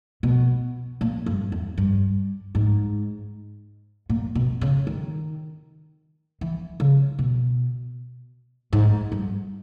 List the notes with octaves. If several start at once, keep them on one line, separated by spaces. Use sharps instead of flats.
B2
A#2
G2
E2
G2
G#2
A#2
B2
C#3
D#3
E3
C#3
B2
G#2
G2